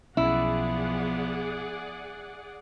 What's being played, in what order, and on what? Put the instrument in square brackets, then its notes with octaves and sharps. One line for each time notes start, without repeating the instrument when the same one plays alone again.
[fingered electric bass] B1 C#4 [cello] F3 B3 [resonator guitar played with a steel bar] E4 [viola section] G#4 D5 F#5